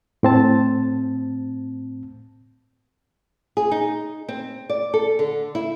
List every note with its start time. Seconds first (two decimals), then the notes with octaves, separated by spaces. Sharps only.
0.23 A2 C4 A5
3.57 G#4
3.71 D#4
4.28 C4
4.70 D5
4.94 A4
5.19 D3
5.55 E4